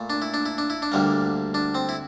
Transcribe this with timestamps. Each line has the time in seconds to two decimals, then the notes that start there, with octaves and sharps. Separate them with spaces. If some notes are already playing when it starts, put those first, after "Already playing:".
Already playing: A#2 A3
0.10 D4
0.22 E4
0.34 D4
0.46 E4
0.58 D4
0.70 E4
0.82 D4
0.92 D2 D3 G3 A#3
1.54 D4
1.75 C4
1.89 E4